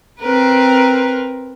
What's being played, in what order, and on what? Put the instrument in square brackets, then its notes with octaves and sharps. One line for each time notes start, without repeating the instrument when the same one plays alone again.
[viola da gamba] C4 A#4 B4